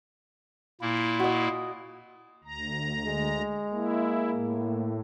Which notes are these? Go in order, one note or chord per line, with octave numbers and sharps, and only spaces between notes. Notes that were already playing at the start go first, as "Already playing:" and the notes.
A#2 A#3 E4
F#4 D#5
D2 A#5
G#3
A#3 E4
A2